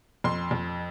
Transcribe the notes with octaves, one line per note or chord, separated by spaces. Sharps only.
F2 C6
F2